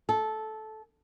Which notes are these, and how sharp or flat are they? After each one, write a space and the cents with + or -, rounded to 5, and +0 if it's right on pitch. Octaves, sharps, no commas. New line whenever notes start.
A4 -15